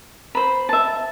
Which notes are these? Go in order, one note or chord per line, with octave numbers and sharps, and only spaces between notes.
C5 B5
E5 A5